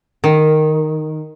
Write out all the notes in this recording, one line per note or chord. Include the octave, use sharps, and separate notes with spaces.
D#3